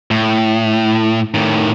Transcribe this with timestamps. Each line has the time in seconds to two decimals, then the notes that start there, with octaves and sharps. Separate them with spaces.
0.11 A2
1.35 A2 D#3